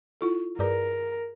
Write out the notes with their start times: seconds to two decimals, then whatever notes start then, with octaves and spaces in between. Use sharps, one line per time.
0.21 E4 F4 A4
0.59 G2 G#4 A#4 B4 D5 A#5